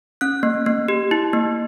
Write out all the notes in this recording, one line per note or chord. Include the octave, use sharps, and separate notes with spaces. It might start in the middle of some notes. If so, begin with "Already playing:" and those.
C#4 F#6
A#3
A#3
G4
E4
A#3